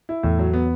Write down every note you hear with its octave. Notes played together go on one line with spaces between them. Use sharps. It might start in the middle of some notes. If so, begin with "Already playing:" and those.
E4
E2 A2
F#3
B3